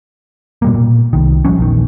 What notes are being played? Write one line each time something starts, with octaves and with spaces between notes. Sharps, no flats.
B2 G3 A#3
A#2
C2 D#3
D1 F3 G3 C#4
A#1 E2 D#3